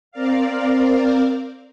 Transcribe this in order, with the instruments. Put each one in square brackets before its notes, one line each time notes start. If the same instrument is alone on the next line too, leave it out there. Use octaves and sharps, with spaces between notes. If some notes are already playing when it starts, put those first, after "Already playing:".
[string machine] C4 A#4 D5 F5